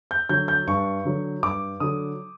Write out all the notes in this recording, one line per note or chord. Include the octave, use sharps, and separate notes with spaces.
G6
D3 F#3 G6
G6
G2 C#6
D3 F#3
G2 D6
D3 F#3 D#6